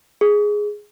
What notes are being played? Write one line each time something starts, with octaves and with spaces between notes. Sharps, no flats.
G#4